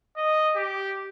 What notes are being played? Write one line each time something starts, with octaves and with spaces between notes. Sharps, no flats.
D#5
G4